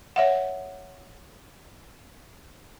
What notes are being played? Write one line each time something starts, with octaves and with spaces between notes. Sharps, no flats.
C#5 E5 F#5